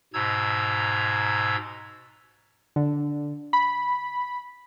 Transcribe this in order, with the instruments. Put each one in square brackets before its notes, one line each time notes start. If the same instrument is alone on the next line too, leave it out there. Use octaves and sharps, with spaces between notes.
[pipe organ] G#2 B2 A#5 E6 G#6
[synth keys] D3
B5